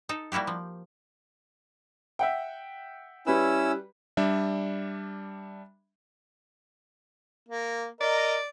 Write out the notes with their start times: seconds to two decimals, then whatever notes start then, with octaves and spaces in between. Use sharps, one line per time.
0.09 D#4 A4
0.32 G3 A#3 E4 F#4 G4
0.47 F3
2.19 E5 F#5 G5
3.27 G3 C#4 E4 B4 E6
4.17 G3 D4 E5
7.49 A#3
8.01 A#4 D5 D#5